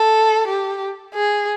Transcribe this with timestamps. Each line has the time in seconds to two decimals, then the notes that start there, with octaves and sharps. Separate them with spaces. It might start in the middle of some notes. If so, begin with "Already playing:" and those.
Already playing: A4
0.48 G4
1.14 G#4